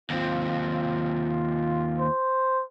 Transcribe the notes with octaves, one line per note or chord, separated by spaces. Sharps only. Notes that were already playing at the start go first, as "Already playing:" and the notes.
D#2 C4 F4
C5